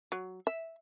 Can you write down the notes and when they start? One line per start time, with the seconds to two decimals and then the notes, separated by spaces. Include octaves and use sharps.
0.12 F#3
0.47 E5